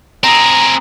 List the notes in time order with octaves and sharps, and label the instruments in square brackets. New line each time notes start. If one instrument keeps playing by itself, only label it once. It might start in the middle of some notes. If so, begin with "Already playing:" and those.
[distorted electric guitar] C4 G#4 [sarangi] A#5